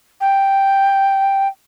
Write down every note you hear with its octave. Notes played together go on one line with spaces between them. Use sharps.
G5